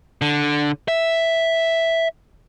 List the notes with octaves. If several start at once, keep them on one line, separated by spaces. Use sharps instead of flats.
D3
E5